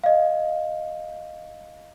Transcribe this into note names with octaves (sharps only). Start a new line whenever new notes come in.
D#5 F5